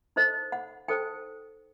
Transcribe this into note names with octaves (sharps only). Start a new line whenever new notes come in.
D#4 A4 C5 D#5
F#5
D#4 A4 C5 G5